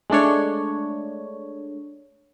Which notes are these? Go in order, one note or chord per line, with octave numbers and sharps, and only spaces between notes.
G#3 A3 D4 C#5